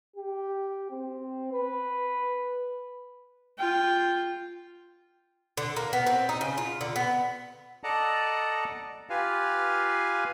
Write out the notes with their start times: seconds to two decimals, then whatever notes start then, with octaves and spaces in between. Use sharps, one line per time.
0.16 G4
0.91 C4
1.52 B4
3.59 F4 G5
5.57 D3
5.76 A#3
5.93 B3
6.06 C4
6.29 D#4
6.41 C#3
6.58 F4
6.81 D3
6.96 B3
7.84 A4 D5 D#5 F#5 A5 A#5
9.10 F4 G4 B4 F5 G#5